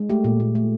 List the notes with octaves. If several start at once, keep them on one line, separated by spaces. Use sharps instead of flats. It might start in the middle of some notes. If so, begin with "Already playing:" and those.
Already playing: G#3
A3 G4
A#2
A#2
A3